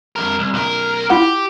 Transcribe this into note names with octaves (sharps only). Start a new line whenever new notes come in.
F2 A#4
C2
B1 A#4
E4 F4 G4 F#5